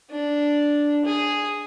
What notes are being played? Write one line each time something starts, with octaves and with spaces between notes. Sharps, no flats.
D4
G#4